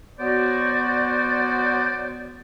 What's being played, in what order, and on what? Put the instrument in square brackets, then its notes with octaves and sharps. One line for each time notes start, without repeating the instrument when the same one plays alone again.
[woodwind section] F#3 B3 F#4 C5 D5